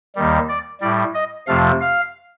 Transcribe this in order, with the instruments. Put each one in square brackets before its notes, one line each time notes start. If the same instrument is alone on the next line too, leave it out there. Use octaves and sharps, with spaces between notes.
[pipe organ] D#2 D#3 G3
D5
A2 G3 D5
D#5
F2 C3 F3 A3 F5
F5